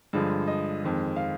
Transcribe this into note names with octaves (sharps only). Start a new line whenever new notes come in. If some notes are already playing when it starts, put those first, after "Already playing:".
G2 D3 F3 G#3
D#5
F2 D#3 G#3
F5